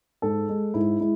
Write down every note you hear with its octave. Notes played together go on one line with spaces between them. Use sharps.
G#2 A4
G#3
G#2 E4
G#3 E4